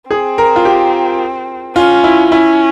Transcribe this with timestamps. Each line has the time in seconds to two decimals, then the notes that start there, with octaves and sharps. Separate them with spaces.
0.10 C4 G#4
0.38 A#4
0.56 F4
0.65 G4
1.76 C#4 F4
2.04 E4
2.32 C#4 E4